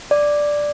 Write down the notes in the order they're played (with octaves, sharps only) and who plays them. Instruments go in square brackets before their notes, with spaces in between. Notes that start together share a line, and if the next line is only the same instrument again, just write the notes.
[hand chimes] D5